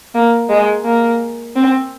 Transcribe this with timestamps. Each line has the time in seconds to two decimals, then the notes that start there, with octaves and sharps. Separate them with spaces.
0.14 A#3
0.50 G#3
0.85 A#3
1.56 C4